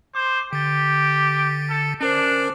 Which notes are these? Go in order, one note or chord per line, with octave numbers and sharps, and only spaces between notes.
C5 D6
D3 G4 A6
A4
C#4 D4 A#4 C5